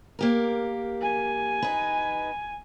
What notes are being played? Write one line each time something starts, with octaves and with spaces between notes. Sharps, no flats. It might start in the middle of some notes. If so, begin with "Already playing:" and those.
A#3 G4 A#4
G#5
D#4 B4